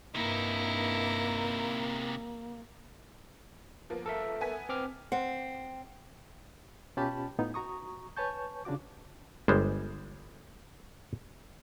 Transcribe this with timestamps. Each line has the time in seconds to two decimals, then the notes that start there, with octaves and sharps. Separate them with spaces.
0.15 G2 C3 A#3 D#4 E4
3.90 F3 A#3 B3
4.06 A4 A#4 E5
4.41 B3 G#5 B6
4.69 C4 D6 F6
5.12 C4 F#5
6.97 B2 C#4 F4 G4 A5 B5
7.39 A2 B3 D#4 F4
7.54 F#4 A#5 C#6 D#6
8.17 B4 C#5 G#5 A5 C#6 G6
8.65 C#3 D4 F4 F#4 D6
9.48 G1 G3 G#3 C5